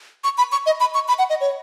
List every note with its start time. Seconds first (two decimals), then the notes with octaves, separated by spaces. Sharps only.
0.24 C#6
0.38 B5
0.52 C#6
0.66 D#5
0.80 B5
0.94 C#6
1.08 B5
1.19 F#5
1.30 D#5
1.41 C#5